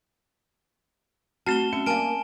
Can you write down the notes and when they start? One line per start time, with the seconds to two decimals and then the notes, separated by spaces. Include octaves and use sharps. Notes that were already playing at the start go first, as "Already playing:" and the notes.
1.46 A3 C4 F#4 A5 F6 E7 G7
1.73 C#4 E5
1.86 A#3 D5 F5 G#5 A5 F6 D7